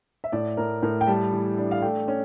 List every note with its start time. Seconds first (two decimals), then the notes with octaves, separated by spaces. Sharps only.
0.24 E5
0.32 A2 D5
0.57 A2 A#4
0.83 A2 A#4
1.01 G5
1.07 G3 A5
1.33 E3
1.58 D4
1.71 F5
1.82 A3 G5
2.08 C#4